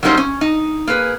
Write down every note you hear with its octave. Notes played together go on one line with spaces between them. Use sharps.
F#3 G3 A#3 C#4 D#4 C5
C#4
D#4
A#3 G#4 B4